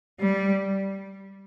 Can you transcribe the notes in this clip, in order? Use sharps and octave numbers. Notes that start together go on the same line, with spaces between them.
G3